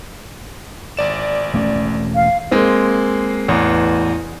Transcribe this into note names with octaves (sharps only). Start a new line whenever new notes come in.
G#1 D5 E7
E1 A3 C#4
F5
G#3 A#3 C4
A1 E2